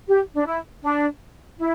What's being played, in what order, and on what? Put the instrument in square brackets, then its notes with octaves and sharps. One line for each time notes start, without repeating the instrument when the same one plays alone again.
[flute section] G4
D4
E4
D4
E4